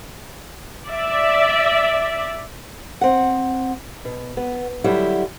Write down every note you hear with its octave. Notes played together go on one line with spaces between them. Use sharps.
D5 E5
C4 F#5
B2
B3
D3 F#3 G3 E4